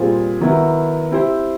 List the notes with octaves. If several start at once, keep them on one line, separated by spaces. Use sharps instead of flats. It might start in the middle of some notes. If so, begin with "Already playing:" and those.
Already playing: A#2 G3 C4 F4 G#4
D#3 F#3 B3 E4
C4 E4 G4 C5